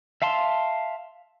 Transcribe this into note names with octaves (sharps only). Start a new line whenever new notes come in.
E5 F5 A5 C6